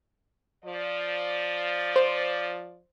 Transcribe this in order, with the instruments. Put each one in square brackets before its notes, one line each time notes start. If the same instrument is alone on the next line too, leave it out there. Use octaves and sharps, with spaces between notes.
[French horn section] F3 D5
[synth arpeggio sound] C5